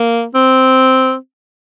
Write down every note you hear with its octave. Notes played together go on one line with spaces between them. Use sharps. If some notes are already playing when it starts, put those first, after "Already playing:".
Already playing: A#3
C4